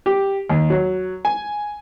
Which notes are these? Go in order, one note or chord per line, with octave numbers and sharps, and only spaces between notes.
G4
D#2
F#3
G#5